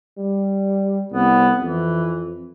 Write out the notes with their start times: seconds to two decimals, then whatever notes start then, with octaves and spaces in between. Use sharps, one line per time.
0.18 G3
1.12 C2 B3
1.60 F2 E3